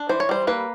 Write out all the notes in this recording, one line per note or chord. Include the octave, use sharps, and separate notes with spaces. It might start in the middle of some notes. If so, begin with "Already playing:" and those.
Already playing: D4
E3 C5
C#5
G3 C5
A#3 B4